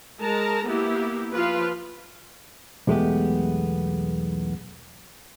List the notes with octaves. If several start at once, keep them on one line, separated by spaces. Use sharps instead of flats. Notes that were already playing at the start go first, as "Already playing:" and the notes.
G#3 A#4 A5 A#5
A#3 B3 E4 G4
F3 F4 B4 F5
B1 E2 G#3 A3 B3 G4